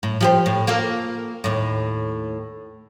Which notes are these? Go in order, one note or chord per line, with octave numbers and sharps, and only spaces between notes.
A2
F3 G4 C5
A2
A#3 F4 A4
D#2 A2